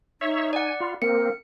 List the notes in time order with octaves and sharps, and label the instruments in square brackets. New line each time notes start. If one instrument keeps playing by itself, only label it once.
[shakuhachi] D#4 [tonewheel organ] C#5 E5
[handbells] D5 F#5 [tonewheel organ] G#5
[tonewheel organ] F4 [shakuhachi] B5
[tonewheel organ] A#3 C4 [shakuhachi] A#4 [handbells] C#7